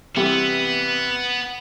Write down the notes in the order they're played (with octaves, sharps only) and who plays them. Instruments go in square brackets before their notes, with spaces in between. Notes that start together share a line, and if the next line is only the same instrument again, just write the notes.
[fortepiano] C3 E3 G3 [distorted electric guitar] B3